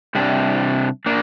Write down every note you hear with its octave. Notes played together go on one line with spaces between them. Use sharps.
C3 G3 D4
A#3 D4